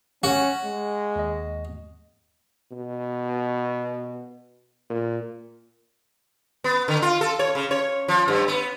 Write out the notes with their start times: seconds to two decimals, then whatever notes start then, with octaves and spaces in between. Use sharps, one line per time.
0.23 C#4 F#4
0.65 G#3
1.16 D#2 D#5
2.71 B2
4.90 A#2
6.64 B3
6.88 D3
7.02 F4
7.21 A4
7.39 C#5
7.55 C#3
7.71 C#5
8.08 F3
8.28 G2
8.48 B3